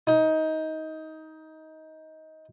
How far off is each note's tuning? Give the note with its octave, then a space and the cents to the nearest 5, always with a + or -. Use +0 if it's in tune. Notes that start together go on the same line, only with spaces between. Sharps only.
D#4 +20